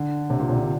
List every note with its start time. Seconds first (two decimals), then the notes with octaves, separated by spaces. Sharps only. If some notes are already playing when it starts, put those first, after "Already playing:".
Already playing: D3
0.30 C3
0.40 A#2
0.49 C3
0.58 D3